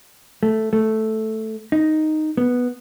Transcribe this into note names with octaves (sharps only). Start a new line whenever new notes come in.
A3
A3
D#4
B3